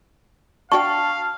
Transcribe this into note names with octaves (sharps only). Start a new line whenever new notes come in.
D4 F#4 F5 G5 A5 C#6